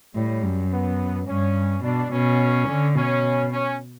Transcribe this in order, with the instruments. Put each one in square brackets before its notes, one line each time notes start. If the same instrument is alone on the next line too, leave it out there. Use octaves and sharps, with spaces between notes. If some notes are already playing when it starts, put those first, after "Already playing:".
[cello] A2 [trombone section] G3
[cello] F#2
[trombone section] B3
[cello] G2 [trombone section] C#4
[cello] B2 [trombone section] D4
[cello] B2 [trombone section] C#4
[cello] D3
[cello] B2 [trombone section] C#4
[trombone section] C#4